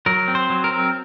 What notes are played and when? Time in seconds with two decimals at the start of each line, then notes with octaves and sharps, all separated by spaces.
0.06 F#3 A#4
0.28 C4
0.35 C5
0.50 F#3
0.64 A#4
0.71 C4